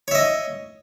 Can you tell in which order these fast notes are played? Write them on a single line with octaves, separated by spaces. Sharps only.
C#5 E5 D#5